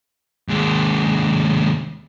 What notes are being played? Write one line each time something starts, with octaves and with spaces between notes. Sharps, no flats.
D#2 G#3